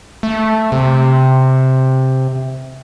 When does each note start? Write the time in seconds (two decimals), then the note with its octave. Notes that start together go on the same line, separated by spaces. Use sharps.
0.23 A3
0.72 C3